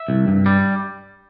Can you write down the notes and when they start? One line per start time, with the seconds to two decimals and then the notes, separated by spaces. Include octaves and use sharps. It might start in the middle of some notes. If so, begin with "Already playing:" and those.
Already playing: E5
0.08 C2
0.28 G2
0.46 G3